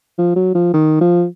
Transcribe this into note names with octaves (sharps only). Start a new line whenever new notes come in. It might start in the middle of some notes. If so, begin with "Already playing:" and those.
F3
F#3
F3
D#3
F3